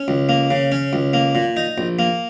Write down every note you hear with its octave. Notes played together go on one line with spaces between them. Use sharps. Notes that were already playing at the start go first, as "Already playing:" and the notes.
Already playing: C#4
C#2
A#3
C#3
C#4
C#2
A#3
A#2
D#4
A#1
A#3